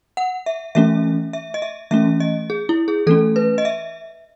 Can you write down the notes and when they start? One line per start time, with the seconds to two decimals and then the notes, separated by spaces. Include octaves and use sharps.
0.17 F#5
0.46 E5
0.75 E3 A3 C#4 E5
1.33 E5
1.54 D#5
1.62 E5
1.91 E3 A3 C#4 E5
2.20 D#5
2.50 G#4
2.69 E4
2.88 G#4
3.07 E3 A3 C#4 A4
3.36 B4
3.58 D#5
3.65 E5